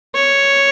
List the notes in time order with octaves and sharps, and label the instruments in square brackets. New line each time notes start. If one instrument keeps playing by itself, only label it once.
[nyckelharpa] C#5